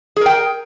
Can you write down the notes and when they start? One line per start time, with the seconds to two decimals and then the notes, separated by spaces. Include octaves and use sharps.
0.16 G#4
0.21 A#4
0.26 G5